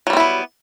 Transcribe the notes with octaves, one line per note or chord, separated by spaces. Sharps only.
F#3 G3 B3 C4 E4